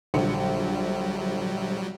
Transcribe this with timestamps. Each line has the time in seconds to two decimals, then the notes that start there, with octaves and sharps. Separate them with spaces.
0.14 A#1 D3 F#3 G3 C#7